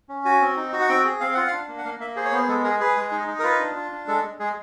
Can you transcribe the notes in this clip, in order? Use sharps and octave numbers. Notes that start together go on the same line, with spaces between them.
C#4
F#4 G#5
C4
D#4
F#4
F#5
C4 G5
G#4
C4 F5
F4 F#5
D4 F5
A#3
F#5
A#3 F5
A#3 E5
G#4 C5
C#5
B3 C5
G#3 A4
G#4 A#4
G#4 B4
G#3
D#4
D#4
A#4
F4 B4
D4
F4
D4
G#3 A4
G#3
G#3 G#4